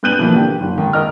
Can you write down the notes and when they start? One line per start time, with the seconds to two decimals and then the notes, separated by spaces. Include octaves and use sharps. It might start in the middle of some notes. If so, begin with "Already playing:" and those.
0.03 G2 B3 F#6 G6 D#7 F#7
0.18 B2 E3 F3 A#3
0.35 D3 G4
0.59 F#1
0.78 G#2 D#3
0.93 A#4 D#5 F6